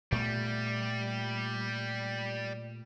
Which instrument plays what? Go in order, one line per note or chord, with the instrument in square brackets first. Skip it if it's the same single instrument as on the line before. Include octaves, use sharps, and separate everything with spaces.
[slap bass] A#2 A3 B3 [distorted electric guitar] G3